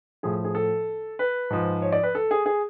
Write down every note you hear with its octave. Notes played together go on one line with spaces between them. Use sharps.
A2 F3 G#4
G#4
A4
B4
G#2 F3
C#5
D5
B4
A4
G#4
G#4